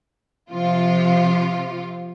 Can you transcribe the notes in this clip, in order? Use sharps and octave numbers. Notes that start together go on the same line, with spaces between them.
C3 F3 F4